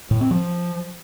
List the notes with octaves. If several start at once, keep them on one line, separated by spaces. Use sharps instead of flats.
A2
C4
F3